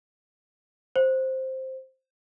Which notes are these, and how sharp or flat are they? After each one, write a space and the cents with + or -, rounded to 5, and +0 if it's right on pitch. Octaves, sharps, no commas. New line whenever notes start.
C5 +5